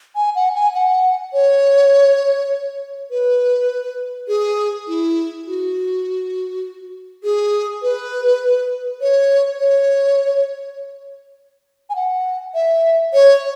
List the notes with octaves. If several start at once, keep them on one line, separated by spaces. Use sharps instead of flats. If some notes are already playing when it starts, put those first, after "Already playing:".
G#5
F#5
G#5
F#5
C#5
B4
G#4
E4
F#4
G#4
B4
C#5
C#5
G#5
F#5
E5
C#5